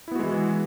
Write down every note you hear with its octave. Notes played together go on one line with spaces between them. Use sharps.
E3 G#3 B3 E4 F#4